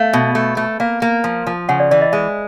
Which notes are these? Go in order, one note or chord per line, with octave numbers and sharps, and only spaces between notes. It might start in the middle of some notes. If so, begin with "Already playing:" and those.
Already playing: A3 F5
B2
A3
A3
A#3 F5
A#3
F3
F3
C#3 F#5
D5
E3 D5
D#5
G#3 E5